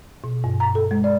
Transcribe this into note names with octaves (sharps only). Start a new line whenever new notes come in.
B2
G2
A#5
A4
G#3
D5